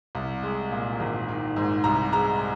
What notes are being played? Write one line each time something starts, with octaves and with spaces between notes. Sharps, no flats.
C2
G#3
A#2
G#1
D#3
G#2
C2 A#5
G#3 A#5